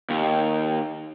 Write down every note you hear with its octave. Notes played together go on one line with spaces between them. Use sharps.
D#2